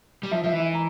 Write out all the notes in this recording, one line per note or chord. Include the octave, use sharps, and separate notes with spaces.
G3
F3 E5
F3 E5
E3
E5
A#5